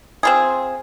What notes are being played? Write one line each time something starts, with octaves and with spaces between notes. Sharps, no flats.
C4 F4 G#4